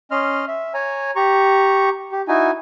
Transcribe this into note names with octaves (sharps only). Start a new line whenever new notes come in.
C#4 D#5 C6 F6
E5
C#5 G#5 A#5
G4 A#5 C#6
G4
D#4 E4 F#4 G#5